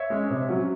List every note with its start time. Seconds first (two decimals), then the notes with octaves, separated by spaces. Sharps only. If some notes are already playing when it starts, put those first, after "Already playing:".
Already playing: C#5 E5
0.10 G#3 C#4
0.30 C3
0.49 F#3 C#4